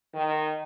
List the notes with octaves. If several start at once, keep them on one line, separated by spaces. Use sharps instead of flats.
D#3